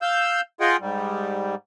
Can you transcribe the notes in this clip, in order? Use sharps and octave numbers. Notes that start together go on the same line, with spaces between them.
F5 E6 G6
F4 G#4 D#5 F#5 G5 C6
G#2 G3